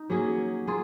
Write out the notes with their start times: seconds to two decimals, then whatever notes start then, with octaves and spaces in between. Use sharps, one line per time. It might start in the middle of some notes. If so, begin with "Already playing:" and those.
Already playing: D#4
0.10 F#3 A#3 C#4 G#4
0.67 A#3 F4 G#4